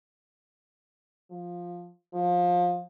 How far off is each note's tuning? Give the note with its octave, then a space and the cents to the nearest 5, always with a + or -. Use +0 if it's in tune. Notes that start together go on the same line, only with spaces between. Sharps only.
F3 +5
F3 +20